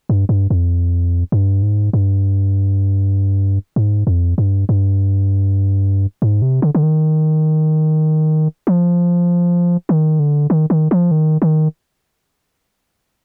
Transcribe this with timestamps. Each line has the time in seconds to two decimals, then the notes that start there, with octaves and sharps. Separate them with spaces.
0.09 G2
0.29 G2
0.50 F2
1.32 G2
1.62 G#2
1.93 G2
3.76 G#2
4.07 F2
4.38 G2
4.69 G2
6.22 G#2
6.42 C3
6.62 D3
6.75 D3
6.83 D#3
8.67 F3
9.89 D#3
10.19 D3
10.50 D#3
10.70 D#3
10.91 F3
11.11 D#3
11.42 D#3